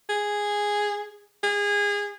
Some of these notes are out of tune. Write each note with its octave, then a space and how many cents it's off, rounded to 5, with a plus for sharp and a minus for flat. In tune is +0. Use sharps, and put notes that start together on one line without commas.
G#4 -5
G#4 -25